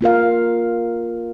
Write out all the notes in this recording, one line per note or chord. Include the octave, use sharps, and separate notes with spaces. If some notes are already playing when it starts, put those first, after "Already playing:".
A#3 F4 A#4 F5